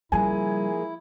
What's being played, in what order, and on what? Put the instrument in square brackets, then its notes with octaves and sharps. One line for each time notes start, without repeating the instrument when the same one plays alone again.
[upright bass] C#3 G3 [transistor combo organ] F3 A#3 G#4 [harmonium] E4 [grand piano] G#5